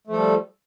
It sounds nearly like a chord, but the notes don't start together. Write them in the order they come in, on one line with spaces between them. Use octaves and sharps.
A3 F3 A4 G3